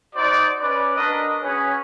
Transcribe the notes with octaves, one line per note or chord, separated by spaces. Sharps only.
D#4 F#4 C5 D5
C#4 B4 D5
D4 F#4 A#4 B4 D#5
C#4 F#4 G#4 B4 C#5